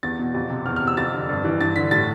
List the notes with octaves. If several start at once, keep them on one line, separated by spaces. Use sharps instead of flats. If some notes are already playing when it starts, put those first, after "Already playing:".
E2 A6
B2
F2
C3
E2 F6
F6
C3
E6
F2 A6
D3
G2
E3
G2 A6
D3 B6
A2 A6